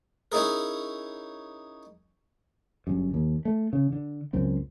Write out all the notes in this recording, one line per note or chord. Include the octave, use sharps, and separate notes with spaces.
C#4 D#4 E4 G#4 A#4
G1 F#2
D#2
A3
C#3
D3
C#2 F#2 C4